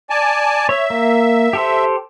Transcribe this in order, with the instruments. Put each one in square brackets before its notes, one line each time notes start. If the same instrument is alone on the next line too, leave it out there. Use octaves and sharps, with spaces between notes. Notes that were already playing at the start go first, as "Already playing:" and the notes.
[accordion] D5 G#5 A5
[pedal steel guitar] C#5 [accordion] E5
[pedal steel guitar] A#3
G4 A4 C5